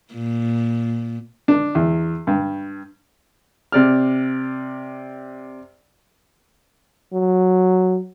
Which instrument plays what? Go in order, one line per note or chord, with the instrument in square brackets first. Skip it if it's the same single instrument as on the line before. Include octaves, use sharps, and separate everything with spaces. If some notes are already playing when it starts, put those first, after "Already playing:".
[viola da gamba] A#2
[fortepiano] D4
E2
G2
C3 D5 F6
[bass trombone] F#3